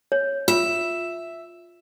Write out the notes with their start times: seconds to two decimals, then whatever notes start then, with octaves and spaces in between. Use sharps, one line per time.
0.12 C#5
0.48 F4 E5